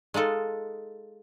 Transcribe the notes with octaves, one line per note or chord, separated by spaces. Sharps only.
G#3 D#4 F4 A4